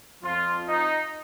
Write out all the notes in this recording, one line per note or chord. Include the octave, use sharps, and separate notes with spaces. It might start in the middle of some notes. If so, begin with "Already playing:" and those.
F2 F3 F4
D#4